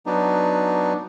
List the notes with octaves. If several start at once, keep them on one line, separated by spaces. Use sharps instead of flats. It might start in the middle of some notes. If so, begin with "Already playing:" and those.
F#3 B3 D4 D#4